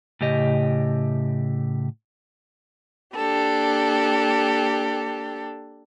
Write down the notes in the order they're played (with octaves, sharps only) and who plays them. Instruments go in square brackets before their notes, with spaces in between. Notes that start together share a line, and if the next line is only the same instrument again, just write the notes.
[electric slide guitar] A2 C#3 G4 D#5
[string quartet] A#3 D4 G4 A4